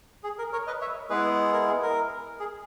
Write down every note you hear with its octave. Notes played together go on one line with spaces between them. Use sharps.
G#4
A#4
A#4 C#5
B4 D#5
C#5 E5
G#3 B3 E4 G#4 B4
A#4
G#4
A#4
G#4